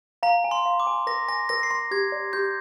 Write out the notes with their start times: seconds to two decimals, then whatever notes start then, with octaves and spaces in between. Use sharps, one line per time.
0.23 F5 A#5
0.44 G#5
0.51 C6
0.65 F5
0.80 D6
0.87 G#5
1.07 A#4 A#6
1.29 G#5 A#6
1.49 A#4 A#6
1.63 C7
1.70 C6 A#6
1.91 G4 G#6
2.12 D5
2.33 G4 G6